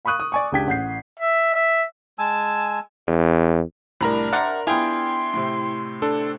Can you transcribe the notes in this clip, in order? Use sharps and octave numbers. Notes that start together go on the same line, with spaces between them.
F5 B5 C#6 D#6 F#6 D#7
C#6 D#6
D5 G#5 C#6
C#2 D4 G4 G5 G#6 B6
A1 F#5 G6 C7
E5
E5
G#3 G#5 A5 E6
E2
C2 A2 D4 A#4 A#5 B5
C3 D5 F#5 C6 F6 A6
B3 D4 E4 F4 G#4 G5 C6
A2 C3
D4 A4